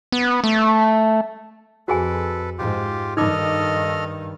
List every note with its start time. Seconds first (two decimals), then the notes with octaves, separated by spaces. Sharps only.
0.12 B3
0.44 A3
1.88 F2 F#4 G#4 A4 B4 G#5
2.58 G#2 F4 G4
3.17 G2 D#3 D#4 A4 D#5 D6 F6